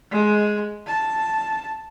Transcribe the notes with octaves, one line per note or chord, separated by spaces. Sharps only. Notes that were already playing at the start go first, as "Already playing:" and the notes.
G#3
A5